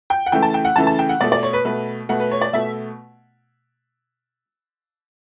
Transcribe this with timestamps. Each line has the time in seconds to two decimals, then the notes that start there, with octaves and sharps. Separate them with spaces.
0.10 G5
0.26 F#5
0.32 C#3 E3 A3 G5
0.42 A5
0.54 G5
0.65 F#5
0.76 C#3 E3 A3 A5
0.87 A5
0.99 G5
1.09 F#5
1.21 B2 A3 D5
1.32 D5
1.43 C#5
1.53 B4
1.65 B2 A3 B4
2.09 B2 A3 F#5
2.20 B4
2.31 C#5
2.41 D5
2.53 B2 A3 E5